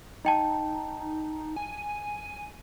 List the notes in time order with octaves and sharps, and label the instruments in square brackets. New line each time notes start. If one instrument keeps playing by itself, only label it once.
[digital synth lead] D#4 [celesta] D#5 G5 A5
[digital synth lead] G#5